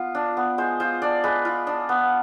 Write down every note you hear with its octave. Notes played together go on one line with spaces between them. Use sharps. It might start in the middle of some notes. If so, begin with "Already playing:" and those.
Already playing: B3 F4
D4
B3
G#3 C5
F4 C5
D4 D5
G#3 B4
F4
D4
B3